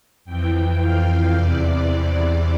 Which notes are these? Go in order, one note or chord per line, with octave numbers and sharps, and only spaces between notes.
F2 E3 G5
F5
E2 C3 E3 D5